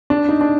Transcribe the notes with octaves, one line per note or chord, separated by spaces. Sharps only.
D4
D#4
D4